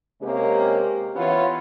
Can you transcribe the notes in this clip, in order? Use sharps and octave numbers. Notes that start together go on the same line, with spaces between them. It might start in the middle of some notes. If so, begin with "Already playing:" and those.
C3 G#3 A#3 C#4 G4
E3 B3 C#4 F4